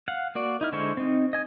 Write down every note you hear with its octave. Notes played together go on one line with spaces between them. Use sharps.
F5 F#5
A#3 F#4 D5
D#4 E4 F6
D3 G#3 E4 C5 C#6
C4 D#4
D#5 G#5 D#6